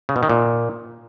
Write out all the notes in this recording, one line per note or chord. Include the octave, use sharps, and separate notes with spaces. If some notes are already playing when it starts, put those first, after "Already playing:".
C#3
B2
D#3
A#2